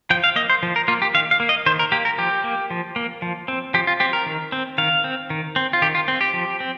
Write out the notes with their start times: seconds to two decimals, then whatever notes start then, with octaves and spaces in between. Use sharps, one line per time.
0.10 F3 G5
0.24 F5
0.36 A#3 D#5
0.50 C5
0.63 F3
0.76 A#4
0.88 A#3 F4
1.02 G4
1.14 D#3 F5
1.31 F5
1.40 A#3
1.49 D#5
1.66 D#3 C5
1.79 A#4
1.92 A#3 G4
2.05 A#4
2.18 F3 G4
2.44 A#3
2.70 F3
2.96 A#3
3.22 F3
3.48 C4
3.74 F3 G4
3.87 F4
4.00 C4 G4
4.13 A#4
4.26 D#3
4.52 C4
4.78 D#3 F5
5.04 C4
5.30 D#3
5.56 C4
5.73 F4
5.82 D#3 G4
5.95 F4
6.08 C4
6.21 G4
6.34 F3
6.60 C4